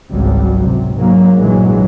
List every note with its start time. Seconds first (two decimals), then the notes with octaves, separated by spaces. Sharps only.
0.11 G#1 C#2 F#3 G3
0.62 C3
0.95 G#2 F#3 A#3
1.38 A#1 G2 E3 F#3 G#3